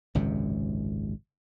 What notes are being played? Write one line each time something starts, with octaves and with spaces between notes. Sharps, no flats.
G#1 C#2 F#2 C3